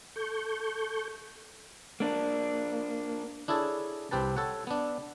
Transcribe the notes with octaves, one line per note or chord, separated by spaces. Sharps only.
A4 C#6 G6
A#3 D4
D4 E4 G#4 A4 C#5
C2 C4 G4 B4 A5
A4 C#5 F#5
B3 D4